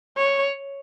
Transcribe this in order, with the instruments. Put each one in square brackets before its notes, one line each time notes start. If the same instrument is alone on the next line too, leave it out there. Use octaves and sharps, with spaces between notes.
[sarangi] C#5